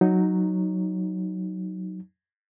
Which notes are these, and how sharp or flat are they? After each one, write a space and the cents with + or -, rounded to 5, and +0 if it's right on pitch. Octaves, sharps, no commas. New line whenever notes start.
F#3 +0 D#4 +0